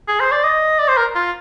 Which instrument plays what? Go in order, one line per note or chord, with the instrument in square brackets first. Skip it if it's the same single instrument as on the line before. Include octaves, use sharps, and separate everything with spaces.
[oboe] G#4
C5
D5
D#5
D5
C5
A#4
F4